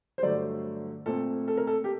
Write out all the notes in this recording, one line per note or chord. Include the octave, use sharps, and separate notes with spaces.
C5
G2 D3 F#3 A3 D5
A#2 A3 C4 A4
A4
A#4
A4
G4